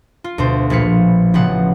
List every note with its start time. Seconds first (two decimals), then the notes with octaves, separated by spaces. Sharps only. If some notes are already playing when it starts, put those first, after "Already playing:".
0.24 F4
0.38 D2 B2 D4 C5
0.70 A#1 A#2 F3 B4 F5 C#7
1.34 A1 C#3 F3 B3 F#5